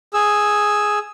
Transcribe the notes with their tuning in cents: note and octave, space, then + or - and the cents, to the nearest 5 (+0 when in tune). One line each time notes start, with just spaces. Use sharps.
G#4 +0 E6 +0